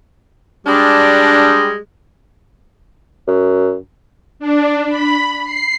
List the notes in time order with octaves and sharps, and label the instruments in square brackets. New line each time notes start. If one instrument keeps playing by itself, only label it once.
[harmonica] G3 G#3 [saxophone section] D4
[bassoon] F#2
[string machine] D4
B5
C7